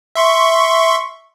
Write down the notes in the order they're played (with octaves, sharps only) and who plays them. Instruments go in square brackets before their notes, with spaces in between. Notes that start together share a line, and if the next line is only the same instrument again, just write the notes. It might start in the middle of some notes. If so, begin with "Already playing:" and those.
[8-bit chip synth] E5 C6 C#6